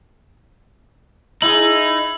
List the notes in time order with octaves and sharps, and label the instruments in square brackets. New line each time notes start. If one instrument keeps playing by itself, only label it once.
[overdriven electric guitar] D#4 [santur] E4 G#4 [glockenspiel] F#7